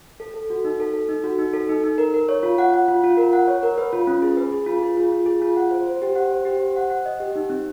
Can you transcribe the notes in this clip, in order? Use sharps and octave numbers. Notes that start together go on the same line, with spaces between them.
A4
A4
F#4
D#4
A4
A4
D#4
F#4
D#4
A4
D#4
D#4
A#4
A#4
C#5
F4
F#5
F#5
F4
F4
A#4
F#5
C#5
A#4
B4
F4
C#4
G#4
B4
G#4
F4
G#4
F4
F4
G#4
F4
F#5
C5
C5
G4
F#5
C5
G4
C5
F#5
F#5
D#5
G4
D#4
C4